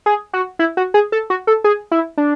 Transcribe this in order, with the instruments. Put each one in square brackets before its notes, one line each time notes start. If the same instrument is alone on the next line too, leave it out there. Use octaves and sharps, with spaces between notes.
[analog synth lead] G#4
F#4
E4
F#4
G#4
A4
F#4
A4
G#4
E4
D4